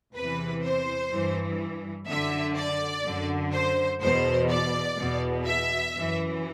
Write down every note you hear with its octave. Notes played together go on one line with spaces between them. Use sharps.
E2 C3 E3 B4
C5
G2 E3
F#2 D3 E5
D5
F#2 D3
C5
E2 B2 C5
D5
E2 B2
E5
F#2 E3